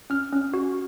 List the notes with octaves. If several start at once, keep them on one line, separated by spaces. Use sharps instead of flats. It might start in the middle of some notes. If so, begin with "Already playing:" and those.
C#4 F6
C#4
F#4